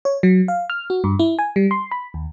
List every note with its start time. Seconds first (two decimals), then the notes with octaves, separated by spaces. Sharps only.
0.05 C#5
0.23 F#3
0.48 F5
0.70 F6
0.90 F#4
1.04 G2
1.19 E4
1.39 G#5
1.56 G3
1.71 C6
1.91 B5
2.14 D#2